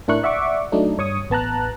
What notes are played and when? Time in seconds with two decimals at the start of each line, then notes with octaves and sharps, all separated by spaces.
0.08 A2 D4 E4 A#4 C#6 F#6
0.23 D5 E5 F#5 C#6 D6
0.72 F#3 A3 D4 D#4
0.98 G2 C#5 C#6 D#6
1.30 A1 B3 A5 A#5 F#6